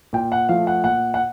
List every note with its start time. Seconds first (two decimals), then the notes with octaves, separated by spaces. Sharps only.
0.13 A#2 G5
0.32 F#5
0.49 F3 A3 F5
0.67 F#5
0.84 A#2 F#5
1.14 F#5